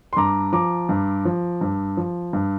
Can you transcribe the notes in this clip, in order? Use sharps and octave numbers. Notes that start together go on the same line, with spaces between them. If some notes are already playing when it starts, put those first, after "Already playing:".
C6
G2 A#5 D6
F3 A#5 D6
G2
F3
G2
F3
G2